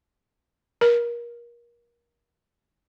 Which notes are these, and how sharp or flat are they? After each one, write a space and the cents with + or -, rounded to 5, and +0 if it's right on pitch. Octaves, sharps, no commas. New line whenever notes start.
A#4 +30